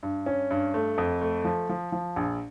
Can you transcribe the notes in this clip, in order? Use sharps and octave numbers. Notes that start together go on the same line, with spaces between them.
G2
C#4
G2
A3
F2
A3
F3
F3
F3
A#1